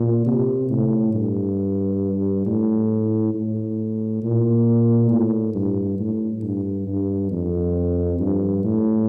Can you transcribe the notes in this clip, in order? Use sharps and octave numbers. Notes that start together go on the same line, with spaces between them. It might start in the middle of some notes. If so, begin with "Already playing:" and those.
Already playing: A#2
C3
A2
G2
A2
A2
A#2
A2
G2
A2
G2
G2
F2
G2
A2